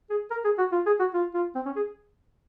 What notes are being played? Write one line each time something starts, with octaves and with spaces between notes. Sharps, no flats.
G#4
A#4
G#4
F#4
F4
G#4
F#4
F4
F4
C4
C#4
G#4